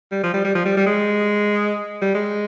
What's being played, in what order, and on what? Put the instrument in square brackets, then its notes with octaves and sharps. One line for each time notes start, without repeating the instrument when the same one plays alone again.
[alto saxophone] G3
F3
G3
G3
F3
G3
G3
G#3
G3
G#3